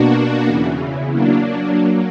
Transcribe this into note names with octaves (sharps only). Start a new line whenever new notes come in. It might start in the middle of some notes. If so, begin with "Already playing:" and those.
Already playing: B2 A#3 D4 F#4
E2 C#3 E3
F#3 A#3 D4
F#3 A#3